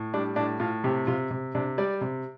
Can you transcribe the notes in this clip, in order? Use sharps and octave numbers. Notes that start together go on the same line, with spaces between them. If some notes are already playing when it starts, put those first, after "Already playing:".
Already playing: A2
G3 D4
A2 D4
A2 F4
C3 G4
C3 F4
C3
C3 D4
G3 D5
C3